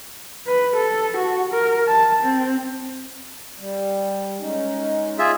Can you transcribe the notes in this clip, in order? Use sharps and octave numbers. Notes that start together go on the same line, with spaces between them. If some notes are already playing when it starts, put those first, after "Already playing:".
B4
A4
F#4
A#4
A5
C4
G3
G#3 C#4 D#4
F4 G#4 E5